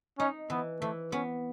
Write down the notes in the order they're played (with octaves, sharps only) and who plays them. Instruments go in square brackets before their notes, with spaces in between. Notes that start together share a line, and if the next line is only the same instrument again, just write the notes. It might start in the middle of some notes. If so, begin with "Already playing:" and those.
[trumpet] C#4 [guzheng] D#4
[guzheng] E3 [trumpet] B3
[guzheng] E3 [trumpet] A3
[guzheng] B3 [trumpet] C#4